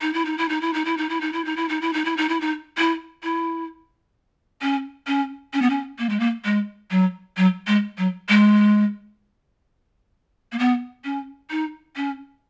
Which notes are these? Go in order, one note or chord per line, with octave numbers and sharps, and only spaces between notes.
D#4
E4
D#4
E4
D#4
E4
D#4
E4
D#4
E4
D#4
E4
D#4
E4
D#4
E4
D#4
E4
D#4
E4
D#4
E4
E4
C#4
C#4
C#4
B3
C#4
A#3
G#3
A#3
G#3
F#3
F#3
G#3
F#3
G#3
A#3
B3
C#4
D#4
C#4